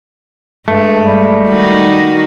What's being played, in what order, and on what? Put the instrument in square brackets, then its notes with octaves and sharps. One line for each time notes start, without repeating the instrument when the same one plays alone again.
[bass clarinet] G2 [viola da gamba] G#3 [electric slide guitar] A3
[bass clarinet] G3
[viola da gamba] D#3 D#4 F#4